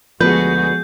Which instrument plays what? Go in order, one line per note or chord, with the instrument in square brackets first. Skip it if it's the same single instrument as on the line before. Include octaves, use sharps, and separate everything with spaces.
[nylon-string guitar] D2 B4 [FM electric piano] F3 B3 [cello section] G#3 F#4 G#4 [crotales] G6